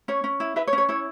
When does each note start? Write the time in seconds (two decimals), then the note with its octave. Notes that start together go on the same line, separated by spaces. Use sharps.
0.08 C#4 C#5
0.24 C#4
0.40 E4
0.56 E4 B4 E5
0.67 C#5
0.73 C#4
0.78 C#5
0.89 E4 C#5